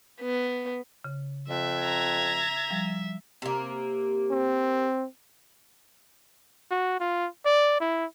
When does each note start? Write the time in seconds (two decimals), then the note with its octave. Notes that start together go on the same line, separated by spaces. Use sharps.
0.21 B3
1.04 C#3
1.49 F2 E5
1.81 A#5 G#6
2.70 F3 G3
3.42 C3 A#3
4.31 C4
6.71 F#4
7.00 F4
7.45 D5
7.80 E4